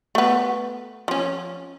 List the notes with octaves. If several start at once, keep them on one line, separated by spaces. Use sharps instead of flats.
A3 B3
F3 C#4